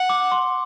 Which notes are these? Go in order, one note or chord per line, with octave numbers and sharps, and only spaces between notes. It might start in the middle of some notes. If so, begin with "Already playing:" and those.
Already playing: F#5
D6
C6